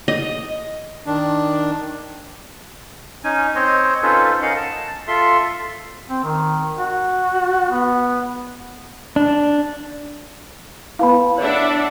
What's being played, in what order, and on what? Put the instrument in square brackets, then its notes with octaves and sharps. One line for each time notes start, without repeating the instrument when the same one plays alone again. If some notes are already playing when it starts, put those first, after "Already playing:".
[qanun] D#5
[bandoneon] D#3 D4
[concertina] C#4 D#4 G#5
C4 C5 C#5 D#5
C#4 D#4 F4 A4 B4 C5
C#4 A#4 D#5 F5 F#5
A5
F4 A4 E5 C6
[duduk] C4
D#3
F#4
B3
[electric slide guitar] D4
[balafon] B3 B4 F5 [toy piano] E4 A5 B5
[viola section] D4 E5 F#5 [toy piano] C#5